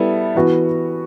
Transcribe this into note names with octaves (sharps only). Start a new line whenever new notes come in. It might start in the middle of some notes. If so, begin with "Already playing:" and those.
Already playing: G3 B3 E4 A4
E3 B3 F#4